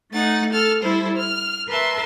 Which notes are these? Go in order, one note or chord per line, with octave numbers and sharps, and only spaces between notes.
A3 D#4 F#5 A6
A4 F6 A6
G3 E4 A4 C5
F6
A#4 B4 E5 A5 C6